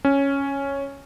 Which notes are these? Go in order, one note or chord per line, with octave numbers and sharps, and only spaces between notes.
C#4